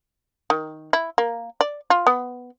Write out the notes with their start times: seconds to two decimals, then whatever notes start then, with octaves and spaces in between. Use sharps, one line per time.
0.50 D#3
0.93 E4
1.18 A#3
1.61 D5
1.90 F4
2.07 B3